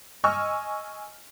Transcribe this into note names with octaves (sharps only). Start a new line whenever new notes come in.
D#5 G#5 C#6 E6 F6